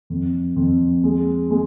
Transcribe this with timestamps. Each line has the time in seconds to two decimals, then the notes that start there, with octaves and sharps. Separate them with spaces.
0.10 F2
0.56 F2
1.04 G#3
1.50 G#3